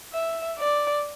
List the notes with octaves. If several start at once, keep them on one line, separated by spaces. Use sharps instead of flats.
E5
D5